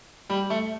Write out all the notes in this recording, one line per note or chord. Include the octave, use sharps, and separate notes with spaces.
G3
A3